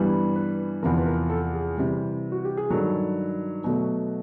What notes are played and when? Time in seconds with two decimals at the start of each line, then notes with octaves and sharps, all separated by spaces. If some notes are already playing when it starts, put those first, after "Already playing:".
Already playing: G2 E3 G3 B3
0.36 B4
0.83 E2 C3 F3 A#4
0.97 B4
1.06 A#4
1.30 A4
1.53 G#4
1.77 C3 E3 G3
2.32 F#4
2.45 G4
2.57 G#4
2.70 G2 D#3 F#3 A4
3.64 B2 F#3 A3